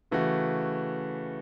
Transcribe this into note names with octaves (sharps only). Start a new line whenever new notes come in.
C#3 E3 A3 C#4 F#4